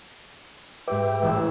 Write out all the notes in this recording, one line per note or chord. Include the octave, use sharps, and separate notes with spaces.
G#2 G4 B4 E5 G5 D6
E1 A1 E6